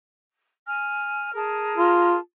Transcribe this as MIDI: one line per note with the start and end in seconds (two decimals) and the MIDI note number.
0.66 1.30 80
0.66 1.30 89
1.33 2.17 68
1.33 2.17 70
1.33 2.17 81
1.77 2.16 65